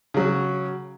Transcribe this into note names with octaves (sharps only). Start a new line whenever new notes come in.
C#3 F#3